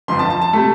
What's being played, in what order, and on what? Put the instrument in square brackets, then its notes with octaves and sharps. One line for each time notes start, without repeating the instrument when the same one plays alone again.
[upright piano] G1 F2 F3 C6
A5
A5
A5
C3 A3 A4